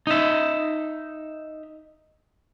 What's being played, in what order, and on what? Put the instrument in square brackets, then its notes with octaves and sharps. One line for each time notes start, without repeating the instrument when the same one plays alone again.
[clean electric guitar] D#4 E5